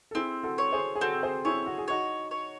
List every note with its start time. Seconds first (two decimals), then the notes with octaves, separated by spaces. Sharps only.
0.11 A4
0.15 C4 E4 G#4
0.43 F#4 A4
0.58 C#5
0.72 G#4 C5
0.95 G#4
1.01 C4 F#4 A4
1.23 G#4 C5
1.45 E4 G#4 C#5
1.66 F#4
1.78 G#4
1.88 D#4 F#4 C#5
2.31 C#5